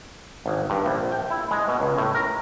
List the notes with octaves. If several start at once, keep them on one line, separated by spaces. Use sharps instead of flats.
G#1
G2
A#1
G5
E4
G#3
B2
C#2
A2
A#4